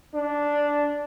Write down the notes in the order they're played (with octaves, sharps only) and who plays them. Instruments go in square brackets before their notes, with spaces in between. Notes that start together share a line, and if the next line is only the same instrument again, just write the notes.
[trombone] D4